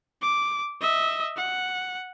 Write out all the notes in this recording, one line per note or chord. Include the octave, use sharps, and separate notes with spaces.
D6
D#5 E5
F#5